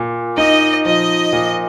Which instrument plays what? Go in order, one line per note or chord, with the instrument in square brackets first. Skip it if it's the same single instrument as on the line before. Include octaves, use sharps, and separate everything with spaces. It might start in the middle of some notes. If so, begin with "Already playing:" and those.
Already playing: [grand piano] A#2
[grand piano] D#4 [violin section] D#5
[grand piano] F3 [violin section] D#5
[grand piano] A#2